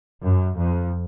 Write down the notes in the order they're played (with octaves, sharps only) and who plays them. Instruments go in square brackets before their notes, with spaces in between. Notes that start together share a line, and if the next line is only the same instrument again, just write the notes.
[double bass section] F#2
F2